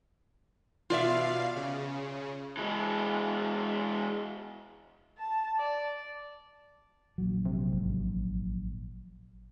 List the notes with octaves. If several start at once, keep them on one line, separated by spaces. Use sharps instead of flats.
B2 F4 D5 E5 F5
C#3
E3 G#3
A5
D5
A#1 F#3
C3
G#1